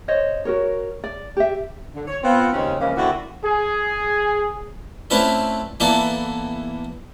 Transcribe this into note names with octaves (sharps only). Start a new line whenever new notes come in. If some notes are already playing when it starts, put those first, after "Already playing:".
C5 C#5 D#5
F#4 A#4 C#5
D5
G4 E5
D3
C#5
B3 C4 F4
D#2 C#3 G#3 C4 C#4
C#3 E3 F3 G#3 A#3 C#4
D3 A#3 C4 E4 F#4
G#4
A3 C4 C#4 E4 B4 D5
E3 A#3 B3 E4 A4 D5